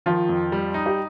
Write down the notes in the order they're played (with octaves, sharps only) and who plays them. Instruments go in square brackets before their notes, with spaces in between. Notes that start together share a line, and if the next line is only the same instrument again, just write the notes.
[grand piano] D#3 [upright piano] F3 F4
[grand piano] F2
G3
D#4
[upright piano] G4